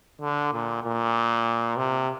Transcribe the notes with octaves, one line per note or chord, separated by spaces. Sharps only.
D3
A#2
A#2
C3